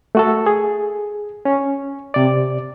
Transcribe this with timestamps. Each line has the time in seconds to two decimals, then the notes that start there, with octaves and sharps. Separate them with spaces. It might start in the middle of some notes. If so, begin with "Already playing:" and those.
0.15 A3 F#4 A4
0.46 G#4
1.45 C#4
2.14 C3 D5